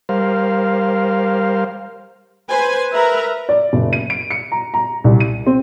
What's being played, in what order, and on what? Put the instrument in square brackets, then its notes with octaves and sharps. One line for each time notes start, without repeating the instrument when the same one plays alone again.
[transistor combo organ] G3 A#4 C5 F5
[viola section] B4 C5 G#5
A#4 B4 E5 A#5
[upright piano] D5
F#1
D#7
D7
C#7
A#5
A#5
C2
D#7
C4